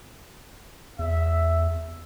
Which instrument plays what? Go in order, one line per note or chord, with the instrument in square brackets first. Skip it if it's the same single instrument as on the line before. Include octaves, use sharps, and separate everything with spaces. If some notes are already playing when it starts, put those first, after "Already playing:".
[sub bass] E2 [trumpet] E5